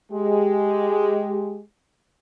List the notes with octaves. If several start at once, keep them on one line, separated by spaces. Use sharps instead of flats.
G#3 G4